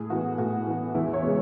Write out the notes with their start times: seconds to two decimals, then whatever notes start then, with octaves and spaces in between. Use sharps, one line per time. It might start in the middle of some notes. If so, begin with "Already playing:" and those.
Already playing: A2 G#4
0.10 E3 B3 F#4
0.38 A2 F#4
0.66 E3 B3
0.94 E2 E4
1.13 C#5
1.22 C#3 E3 G#3 B3